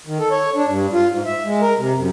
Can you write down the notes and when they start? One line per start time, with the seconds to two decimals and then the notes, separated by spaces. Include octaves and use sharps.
0.07 D#3
0.19 A4
0.31 C#5
0.55 D4
0.68 G2
0.93 F4
1.11 G#2
1.26 E5
1.45 G#3
1.62 A#4
1.78 C3
1.96 F#2